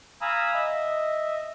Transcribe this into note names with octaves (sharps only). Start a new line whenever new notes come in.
F5 G#5 A#5 B5 D#6 E6
D#5 E5